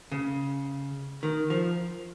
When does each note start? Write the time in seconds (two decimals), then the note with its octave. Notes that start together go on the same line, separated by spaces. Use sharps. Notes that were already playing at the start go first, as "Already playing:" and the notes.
0.12 C#3
1.23 D#3
1.50 F3